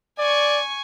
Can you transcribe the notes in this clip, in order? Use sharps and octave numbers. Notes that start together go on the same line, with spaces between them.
D5 G#5 C#6